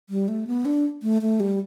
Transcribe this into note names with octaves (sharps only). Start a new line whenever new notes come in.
G3
A3
B3
D4
A3
A3
G3